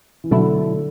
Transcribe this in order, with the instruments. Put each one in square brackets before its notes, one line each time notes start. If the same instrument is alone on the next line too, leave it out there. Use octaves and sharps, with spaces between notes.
[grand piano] E3
[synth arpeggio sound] B2 F#3 A3 E4 [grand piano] D3